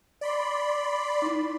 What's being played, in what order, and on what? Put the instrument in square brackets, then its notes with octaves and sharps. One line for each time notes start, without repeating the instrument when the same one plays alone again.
[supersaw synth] D5 B5 C6
[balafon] D#4 E4